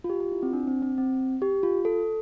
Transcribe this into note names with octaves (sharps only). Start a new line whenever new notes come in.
F4
G4
F4
E4
C4
D4
C4
C4
C4
G4
F4
A4